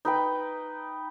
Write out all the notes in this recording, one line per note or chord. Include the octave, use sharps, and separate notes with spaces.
D#4 B4 G5